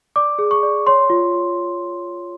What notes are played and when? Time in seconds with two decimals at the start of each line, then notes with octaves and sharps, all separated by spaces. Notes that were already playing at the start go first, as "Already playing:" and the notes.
0.16 D5 D6
0.39 G#4
0.51 C#6
0.63 D5
0.87 C#5 C6
1.10 F4